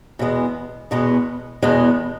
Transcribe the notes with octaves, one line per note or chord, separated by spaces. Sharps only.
E2 B2 G#3 B3
E2 B2 G#3 B3
E2 B2 G#3 B3